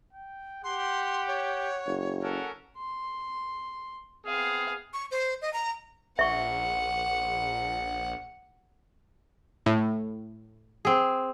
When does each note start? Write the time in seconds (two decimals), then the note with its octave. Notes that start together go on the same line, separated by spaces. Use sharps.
0.13 G5
0.64 G4 F#5 C6
1.28 C#5
1.86 F#1
2.23 C#4 A4 A#4 F#5
2.77 C6
4.26 B3 C4 G#4 F5
4.93 C#6
5.11 C5
5.42 D#5
5.53 A#5
6.19 A#1 E5 F#5 C#6
9.66 A2
10.85 C4 G#4